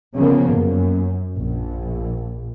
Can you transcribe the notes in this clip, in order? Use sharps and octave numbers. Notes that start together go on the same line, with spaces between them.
C#3 F3 A#3 B3
F#2
A#1